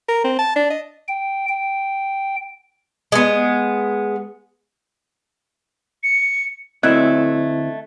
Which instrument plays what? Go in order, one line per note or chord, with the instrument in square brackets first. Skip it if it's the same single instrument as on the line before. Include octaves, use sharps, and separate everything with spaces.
[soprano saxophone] A#4
C4
A5
D4
D#5
[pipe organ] G5
G5
[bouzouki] G#3 B3
[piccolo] C#7
[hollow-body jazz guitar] D2 C4 E4 [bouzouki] A3 [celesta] D#5 F#6 G#6